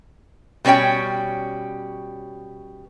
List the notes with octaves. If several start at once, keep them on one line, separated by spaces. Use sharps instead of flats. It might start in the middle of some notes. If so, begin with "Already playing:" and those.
B2 G3 C#4 C#5 G5